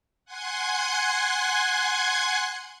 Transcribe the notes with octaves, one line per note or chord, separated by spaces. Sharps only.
F#5 G#5 C6 F#6 G#6